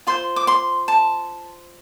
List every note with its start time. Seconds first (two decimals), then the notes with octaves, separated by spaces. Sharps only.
0.07 F4 C5 C6
0.36 D6
0.47 C6
0.88 A5